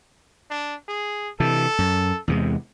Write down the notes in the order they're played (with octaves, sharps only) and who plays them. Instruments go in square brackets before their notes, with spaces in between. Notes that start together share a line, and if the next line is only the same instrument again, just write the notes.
[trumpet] D4
G#4
[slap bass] C3 E3 [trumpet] A4
[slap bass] F#2
E2 C3 G#3